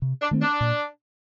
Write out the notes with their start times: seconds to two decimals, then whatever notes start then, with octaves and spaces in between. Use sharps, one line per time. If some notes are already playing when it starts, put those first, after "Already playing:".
0.02 C3
0.22 D4
0.31 D#3 A3 C4
0.42 D4
0.61 A#2